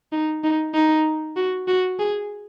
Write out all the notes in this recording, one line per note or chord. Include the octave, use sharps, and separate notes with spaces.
D#4
D#4
D#4
F#4
F#4
G#4